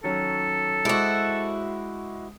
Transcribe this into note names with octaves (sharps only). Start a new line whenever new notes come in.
D#3 F#3 C#4 A4
G#3 E4 F#4 C5 D6